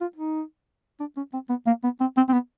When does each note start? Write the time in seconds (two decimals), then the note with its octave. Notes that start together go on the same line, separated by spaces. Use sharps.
0.01 F4
0.16 D#4
1.00 D4
1.17 C#4
1.34 C4
1.50 B3
1.67 A#3
1.84 B3
2.00 C4
2.17 C4
2.29 C4
2.33 B3